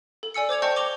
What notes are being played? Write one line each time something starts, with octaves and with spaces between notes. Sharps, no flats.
A4
D5 G#5 E6 C#7
C5 D6 G#6 F7
D#5 G5 A5 C#6 G6 C#7
D6 F7 G7